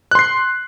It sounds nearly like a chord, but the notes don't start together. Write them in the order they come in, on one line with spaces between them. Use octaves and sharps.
F#6 C6 C7